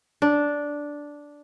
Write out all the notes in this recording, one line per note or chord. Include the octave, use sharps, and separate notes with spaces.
D4